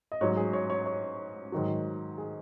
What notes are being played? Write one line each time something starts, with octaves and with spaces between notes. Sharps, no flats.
D#5
G#2 F#3 C#5
G#4
C#5
C#5
C#5
G#2 D#3 F#3
G#4